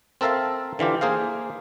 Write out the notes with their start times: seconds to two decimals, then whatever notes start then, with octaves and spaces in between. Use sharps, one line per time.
0.21 C4 A4 A#4 E5 F5 A5
0.79 D3 E3 F4 G4
1.01 A#3 G#4 C5 F5